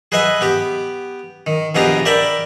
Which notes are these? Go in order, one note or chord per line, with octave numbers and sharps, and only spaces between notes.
G#4 B4 D#5 E5 F#5
B3 G4
D#3
A#1 B2 B3 G4 G#4 A#5
A#4 D5 E5 G5 A5 B5